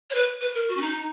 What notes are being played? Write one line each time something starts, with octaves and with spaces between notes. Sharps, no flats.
C#5
B4
B4
A#4
F#4
C#4
D#4